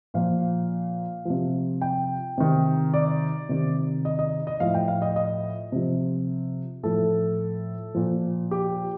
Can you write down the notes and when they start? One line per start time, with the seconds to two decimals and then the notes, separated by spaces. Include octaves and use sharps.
0.14 A#2 F3 F5
1.25 C3 F3
1.81 G5
2.38 C3 D#3
2.94 D5
3.49 C3 D#3
4.05 D#5
4.19 D#5
4.47 D#5
4.60 A2 F3 F5
4.74 G5
4.88 F5
5.02 D#5
5.16 D#5
5.72 C3 F3
6.83 A2 F3 A4
7.95 A#2 F3
8.51 G4